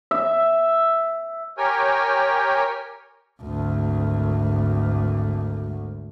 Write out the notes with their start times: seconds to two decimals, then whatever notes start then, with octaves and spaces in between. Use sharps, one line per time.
0.11 E5
1.58 G4 A#4 C#5 G5 G#5
3.42 G#1 D2